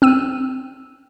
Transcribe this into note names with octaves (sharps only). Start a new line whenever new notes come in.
C4 E6 D#7